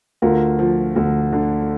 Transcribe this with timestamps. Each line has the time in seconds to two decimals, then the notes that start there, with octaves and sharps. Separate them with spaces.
0.22 D2 F4 A#4
0.59 F3
0.96 D2
1.33 D3